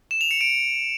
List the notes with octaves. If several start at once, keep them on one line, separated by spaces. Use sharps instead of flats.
E7
F7
C#7
D7